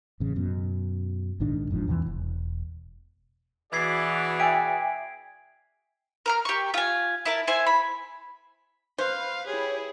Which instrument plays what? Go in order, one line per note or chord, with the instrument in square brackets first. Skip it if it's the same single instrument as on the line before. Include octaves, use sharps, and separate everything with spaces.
[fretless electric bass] A1 C#3
F#2 B2
A#1 G#2 D#3 D4
F1 G#2 F3 D4
E2 C3 E3
E1
[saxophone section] B2 E3 [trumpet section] F#4 G#4 D5 [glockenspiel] G#6 B6 C7
[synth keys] E5 G5 G#5 [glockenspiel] D7
[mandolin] A#4 A#5 F6
G4 C#6
F4 G#5
E4 A#4 A5
E4 C5 G#5
B5
[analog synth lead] B4 [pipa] C5 [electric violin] F5
[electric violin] E4 G#4 [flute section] G4 C#5